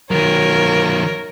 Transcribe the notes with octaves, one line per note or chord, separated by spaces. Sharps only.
D#3 F#3 A#4 C#5